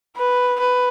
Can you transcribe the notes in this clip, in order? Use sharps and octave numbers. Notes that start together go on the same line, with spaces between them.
B4
B4